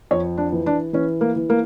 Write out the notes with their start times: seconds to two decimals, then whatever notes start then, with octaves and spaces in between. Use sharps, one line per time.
0.11 F2 C#5
0.38 D4
0.52 E3
0.66 D4
0.93 E3 C#4
1.21 A#3
1.36 E3
1.50 A#3